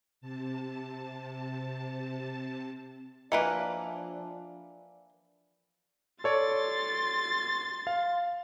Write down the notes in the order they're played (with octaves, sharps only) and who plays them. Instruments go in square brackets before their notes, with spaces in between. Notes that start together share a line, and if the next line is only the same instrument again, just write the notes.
[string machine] C3 A5
[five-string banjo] E3 A#3 B4 [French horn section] F3 D4 [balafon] D#5 E5
[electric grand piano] A4 C#5 D5 [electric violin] C6 A6
[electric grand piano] F5